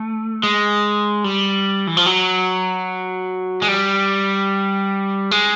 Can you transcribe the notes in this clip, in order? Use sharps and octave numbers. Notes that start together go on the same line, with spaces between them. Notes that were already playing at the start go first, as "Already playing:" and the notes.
Already playing: A3
G#3
G3
E3
F3
F#3
G#3
G3
G#3